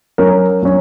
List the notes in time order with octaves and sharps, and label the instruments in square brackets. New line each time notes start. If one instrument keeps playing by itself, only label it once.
[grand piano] F#3 C#4 A#4
F#3 C#4